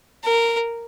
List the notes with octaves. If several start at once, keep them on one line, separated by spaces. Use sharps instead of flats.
A#4